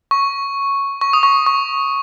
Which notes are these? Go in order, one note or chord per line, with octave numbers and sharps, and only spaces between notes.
C#6
C#6
D#6
C#6
C#6